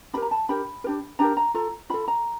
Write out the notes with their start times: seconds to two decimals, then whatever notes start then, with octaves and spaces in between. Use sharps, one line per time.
0.13 D4 G4 A#4 B5
0.22 A#5
0.31 A5
0.49 D4 G4 A#4 B5
0.84 A#4
0.87 D4 G4
1.19 D4 G4 A#4 A#5
1.37 A#5
1.54 F4 A4 A#5
1.90 F4 A4 B5
2.08 A#5